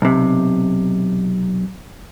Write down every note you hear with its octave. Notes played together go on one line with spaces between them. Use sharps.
B1 C3